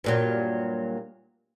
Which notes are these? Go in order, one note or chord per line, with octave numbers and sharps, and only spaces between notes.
G2 A#2 F#3